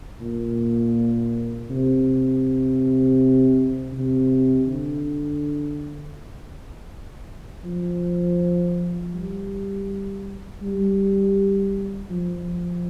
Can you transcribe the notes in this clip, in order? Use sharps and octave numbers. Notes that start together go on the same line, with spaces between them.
A#2
C3
C3
D3
F3
G3
G3
F3